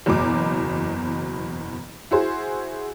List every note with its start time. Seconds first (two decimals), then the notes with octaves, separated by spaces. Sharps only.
0.06 F#1 E2 B2 D6
2.11 E4 F#4 G#4 C5